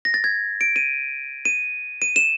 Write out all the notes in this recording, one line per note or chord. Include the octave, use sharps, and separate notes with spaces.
A#6
A6
G#6
D7
D#7
D#7
D#7
E7